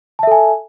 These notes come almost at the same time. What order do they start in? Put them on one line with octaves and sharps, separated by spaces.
A5 E5 A4 G#5